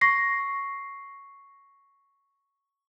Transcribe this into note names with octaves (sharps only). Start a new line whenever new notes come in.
C#6 A#6 C7